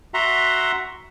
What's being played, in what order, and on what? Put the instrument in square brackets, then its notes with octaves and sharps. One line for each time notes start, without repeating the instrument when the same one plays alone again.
[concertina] F#4 E5 F#5 A#5 C6